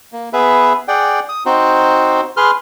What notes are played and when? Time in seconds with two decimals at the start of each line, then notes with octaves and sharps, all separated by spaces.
0.13 A#3
0.33 B3 G#4 B4 E5
0.88 G#4 D5 F#5 G5
1.29 D#6
1.46 C4 D#4 F#4 C5
2.37 G#4 B4 C6 F6